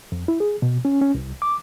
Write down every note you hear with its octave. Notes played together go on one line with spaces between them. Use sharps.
F2
E4
G#4
B2
C#4
C#4
C2
D6